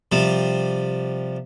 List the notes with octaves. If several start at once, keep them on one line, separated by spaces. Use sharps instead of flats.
C3 F3 G3